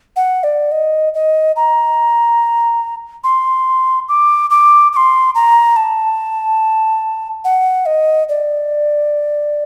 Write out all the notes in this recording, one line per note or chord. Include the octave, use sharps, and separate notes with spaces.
F#5
D5
D#5
D#5
A#5
C6
D6
D6
D6
C6
A#5
A5
F#5
D#5
D5